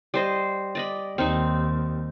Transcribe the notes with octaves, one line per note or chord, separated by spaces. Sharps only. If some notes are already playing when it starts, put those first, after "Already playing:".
G3 C5 D#5
D5 D#5 B5
D#2 C4 D#4